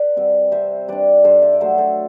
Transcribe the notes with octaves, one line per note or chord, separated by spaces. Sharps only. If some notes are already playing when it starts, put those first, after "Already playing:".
Already playing: B4 D5
G3 C4
C3 C5 E5
G3 D4 B4 D5
G2 A4 C5
C5 E5
D5
F#3 A3 C5 E5
A4 C5